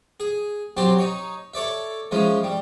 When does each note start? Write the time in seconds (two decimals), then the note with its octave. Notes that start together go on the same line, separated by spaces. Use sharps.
0.20 G#4
0.77 F#3 C4 G4 A5 C6
0.98 D#4 C#5
1.54 A4 C#5 D5 E5
2.11 E3 F3 G#3 C#4
2.43 G3